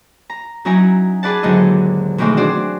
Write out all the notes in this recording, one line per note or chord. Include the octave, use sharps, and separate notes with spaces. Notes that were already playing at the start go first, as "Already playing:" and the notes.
A#5
F#3 C#4 D#4 E4 G#5 A#5
G#4 B4 D5 F#5 A5
D#2 G#2 D3 F#3 E4 D#5
B2 D#3 E3 G#3 A3 C4
D4 F#4 G#4 C5 D5